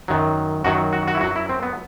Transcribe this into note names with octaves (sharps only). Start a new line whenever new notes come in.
F#2 D#3 F#3
F#2 D#3 F#3 F#4
F#4
F#4
E4
F#2 F#3 F#4
E4
C4
B3